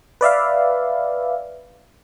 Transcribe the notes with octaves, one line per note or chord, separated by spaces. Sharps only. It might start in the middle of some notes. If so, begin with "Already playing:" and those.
B4 D5 E5 F5